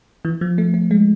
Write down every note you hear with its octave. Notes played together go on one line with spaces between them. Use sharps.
E3
F3
A3
A3
G#3